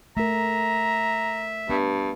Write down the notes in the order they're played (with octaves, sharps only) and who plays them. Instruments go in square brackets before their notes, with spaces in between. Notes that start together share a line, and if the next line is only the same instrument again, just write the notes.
[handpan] A3 A#4 [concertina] E5 [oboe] A#5
[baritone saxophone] G2 [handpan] B3